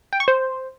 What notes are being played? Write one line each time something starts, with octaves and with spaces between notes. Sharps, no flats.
G5
C#6
C5